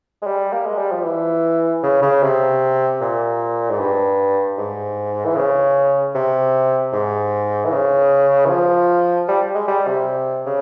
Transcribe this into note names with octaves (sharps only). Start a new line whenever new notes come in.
G#3
G3
A#3
G#3
G3
F3
E3
C#3
C#3
C3
A#2
G#2
G2
G#2
E3
C#3
C3
G#2
E3
C#3
E3
F3
G3
G#3
G3
C3
C#3